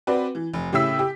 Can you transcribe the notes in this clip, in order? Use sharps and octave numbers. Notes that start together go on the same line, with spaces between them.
C4 F#4 B4 D5
E3
F1
A2 C#3 G4 E5 E6 B6
G4